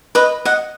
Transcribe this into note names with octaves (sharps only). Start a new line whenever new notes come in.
B4 D#5
D#5 F#5